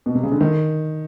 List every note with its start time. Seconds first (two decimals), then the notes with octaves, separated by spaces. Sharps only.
0.06 B2
0.15 C3
0.23 C#3
0.32 D3
0.41 D#3